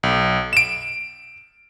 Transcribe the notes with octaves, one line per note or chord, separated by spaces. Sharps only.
B1
D7 E7